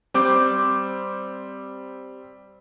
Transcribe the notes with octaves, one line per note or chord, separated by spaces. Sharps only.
G3 C4 D6 G6